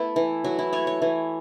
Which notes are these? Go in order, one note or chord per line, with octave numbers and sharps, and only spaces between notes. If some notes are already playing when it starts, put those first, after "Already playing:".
Already playing: A3 B3 E4
E3
F#3 F#4
E4
A3 C#5
C#5
E3